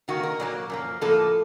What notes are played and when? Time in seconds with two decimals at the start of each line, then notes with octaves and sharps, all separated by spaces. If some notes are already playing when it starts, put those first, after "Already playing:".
0.08 C3 D#3 A#3 F#4
0.23 A#4
0.40 A#2 F#3 A#3
0.70 F#2 F3 A#3
1.01 A2 F3 A#3 A4